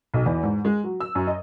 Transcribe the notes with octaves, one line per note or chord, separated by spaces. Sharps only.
B1
E2
G#2
G#3
F#3
E6
F#2
D#5